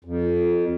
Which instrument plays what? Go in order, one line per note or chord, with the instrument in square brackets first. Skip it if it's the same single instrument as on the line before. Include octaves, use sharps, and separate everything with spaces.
[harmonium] F2